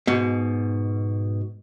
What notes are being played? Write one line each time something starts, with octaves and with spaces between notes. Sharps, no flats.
G#2 B2